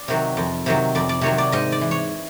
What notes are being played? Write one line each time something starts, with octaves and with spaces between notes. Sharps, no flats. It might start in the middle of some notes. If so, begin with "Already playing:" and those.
Already playing: D5
C3 D#3 F#3
F2
C3 D#3 F#3
F2 D5
D5
C3 D#3 F#3 C#5
D5
G#2 D#5
D5
E3
C#5